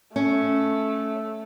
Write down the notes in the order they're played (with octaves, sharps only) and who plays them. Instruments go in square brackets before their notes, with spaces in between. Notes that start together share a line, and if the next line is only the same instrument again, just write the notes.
[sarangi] A3 [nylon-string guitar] C#4